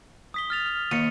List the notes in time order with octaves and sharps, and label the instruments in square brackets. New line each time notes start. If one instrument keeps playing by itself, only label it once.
[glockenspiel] D#6 B6 G7
F6 A6 F7
F6
[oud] D#2 [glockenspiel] C#7 D#7